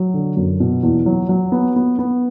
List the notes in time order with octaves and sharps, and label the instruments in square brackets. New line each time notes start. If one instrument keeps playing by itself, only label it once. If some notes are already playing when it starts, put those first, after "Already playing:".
Already playing: [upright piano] F#3
D3
F#2
B2
E2
F#3
F#3
B3
B3
B3